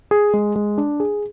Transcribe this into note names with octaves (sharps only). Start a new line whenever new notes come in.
G#4
G#3
G#3
D4
G#4